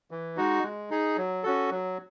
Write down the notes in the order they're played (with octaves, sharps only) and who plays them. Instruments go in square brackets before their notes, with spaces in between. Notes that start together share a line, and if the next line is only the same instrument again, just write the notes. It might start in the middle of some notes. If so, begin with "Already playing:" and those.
[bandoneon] E3
G#3 D#4 F#4
G#3
D#4 G#4
F#3
C#4 F#4 A4
F#3